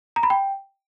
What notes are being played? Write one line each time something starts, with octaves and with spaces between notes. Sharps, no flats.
A#5
B5
G5